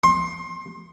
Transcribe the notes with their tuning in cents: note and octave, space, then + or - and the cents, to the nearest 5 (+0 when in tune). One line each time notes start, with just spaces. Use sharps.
C6 +25